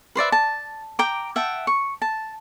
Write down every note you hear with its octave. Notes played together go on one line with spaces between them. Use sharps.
B4 C5 D5 E5
A5
G5 A#5 D6
E5 F#5 G5 A5
C#6
A5